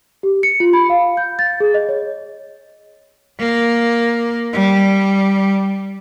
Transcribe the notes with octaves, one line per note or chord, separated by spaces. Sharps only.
G4
C#7
F4
B5
F5
G6
A6
G#4
D#5
C#5
A#3
G3